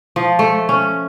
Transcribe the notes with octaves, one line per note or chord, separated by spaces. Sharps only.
F3
A3
C#4